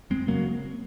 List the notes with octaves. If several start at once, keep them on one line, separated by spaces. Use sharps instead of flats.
F2 G#3 C4
C#3 F#3 A#3